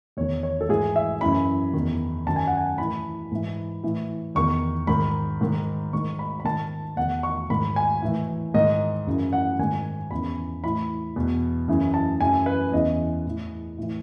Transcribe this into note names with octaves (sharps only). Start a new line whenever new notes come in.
E2 D#3 C#5
C#5
A4
G#2 E3 G#4
E5
F#2 C#3 E3 B5
E2 D#3
F#2 D#3 A5
G#5
F#5
G#5
A2 E3 B5
G#2 E3
A2 E3
E2 D#3 C#6
G#2 D#3 B5
G#2 D#3
G#2 D#3 C#6
B5
B5
G#2 D#3 A5
E2 D#3 F#5
C#6
G#2 D#3 B5
G#5
A2 E3
G#2 D#3 D#5
F#2 C#3 E3
F#5
G#2 D#3 G#5
E2 C#3 E3 B5
A2 E3 B5
E2 B2
F#2 C#3 E3
A5
F#2 C#3 E3 G#5
B4
E2 C#3 E3 D#5
A2 E3
A2 E3